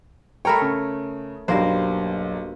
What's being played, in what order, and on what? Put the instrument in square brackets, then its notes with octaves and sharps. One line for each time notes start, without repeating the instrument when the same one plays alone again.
[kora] A3 A#4 C#5 [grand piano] G5 A#5 B5
[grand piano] C#3
[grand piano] B1 [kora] G2 A#3 C5